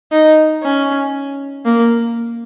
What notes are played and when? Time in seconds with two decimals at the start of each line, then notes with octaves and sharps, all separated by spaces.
0.12 D#4
0.63 C#4
1.66 A#3